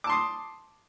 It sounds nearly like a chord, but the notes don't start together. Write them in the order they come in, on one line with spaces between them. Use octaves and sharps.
D6 A5 C6 D#6